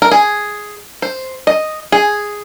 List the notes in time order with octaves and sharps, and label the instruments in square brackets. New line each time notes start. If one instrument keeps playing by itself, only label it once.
[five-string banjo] A#4
G#4
C5
D#5
G#4